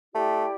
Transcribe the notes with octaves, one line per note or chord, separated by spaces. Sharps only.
A3 E4 G4 D5 G5